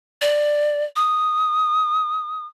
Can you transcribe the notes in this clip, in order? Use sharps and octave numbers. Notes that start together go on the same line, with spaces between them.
D5
D#6